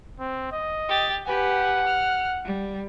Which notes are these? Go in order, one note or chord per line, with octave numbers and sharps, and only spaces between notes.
C4
D#5
G4 A6
G4 B4 F#5 G#5
F6
G3